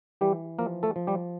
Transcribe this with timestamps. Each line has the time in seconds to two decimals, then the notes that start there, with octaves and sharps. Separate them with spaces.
0.21 E3 G3 G4
0.59 F3 A#3 A#4
0.83 A3 A4
0.96 F3
1.07 G3 G4